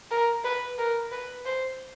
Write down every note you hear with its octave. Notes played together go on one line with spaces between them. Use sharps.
A#4
B4
A#4
B4
C5